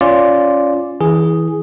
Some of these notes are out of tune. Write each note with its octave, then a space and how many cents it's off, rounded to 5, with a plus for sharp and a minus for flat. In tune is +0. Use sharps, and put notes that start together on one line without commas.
C#4 +0 F4 +0 D5 -5
E3 -20 G#4 +0